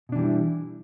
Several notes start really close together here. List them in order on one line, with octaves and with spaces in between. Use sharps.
B2 D4 E3 G3 E4